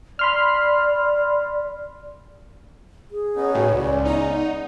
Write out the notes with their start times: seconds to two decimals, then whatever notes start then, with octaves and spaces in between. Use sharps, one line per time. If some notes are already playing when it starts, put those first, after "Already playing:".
0.19 D5 B5 C6 F6
3.11 G#4
3.36 B3 C#4 D#4 C#5
3.55 A2 F#4
3.73 C#2 C#3 G#3 C#4 D5
4.05 B3 D#4